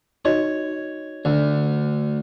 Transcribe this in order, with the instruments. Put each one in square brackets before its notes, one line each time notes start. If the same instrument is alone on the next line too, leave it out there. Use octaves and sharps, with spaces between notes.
[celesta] D#4 F#4 D#5 [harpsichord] C#5
[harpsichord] D2